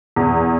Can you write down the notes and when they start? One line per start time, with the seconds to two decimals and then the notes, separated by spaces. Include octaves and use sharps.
0.16 E2